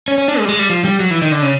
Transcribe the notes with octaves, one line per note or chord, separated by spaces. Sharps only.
C#4
C#4
D4
G#3
G3
G#3
G3
F3
G3
F#3
E3
D#3
D3
C#3